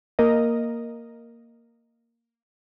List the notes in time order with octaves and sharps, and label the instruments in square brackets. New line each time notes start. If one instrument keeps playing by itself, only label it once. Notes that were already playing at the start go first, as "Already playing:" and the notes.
[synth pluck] A#3 A#4 D#5